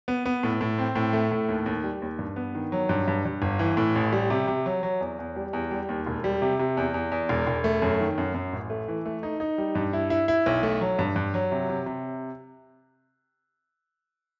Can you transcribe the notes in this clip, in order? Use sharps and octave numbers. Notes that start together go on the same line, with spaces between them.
B3
B3
A2
A2
C4
A2
A3
A2
D#2
D#2
G3
D#2
G2
B3
D#3
F#3
G2
G2
G2
G1
E3
A2
A1
G3
C3
C3
F#3
F#3
E2
E2
G3
E2
G3
D#2
E1
G3
C3
C3
E2
E2
E2
E1
E1
A3
F#2
D#3
F#2
F#2
A1
A3
E3
A3
D#4
D#4
G3
G2
E4
E4
E4
B1
A3
F#3
G2
G2
F#3
C3
C3
C3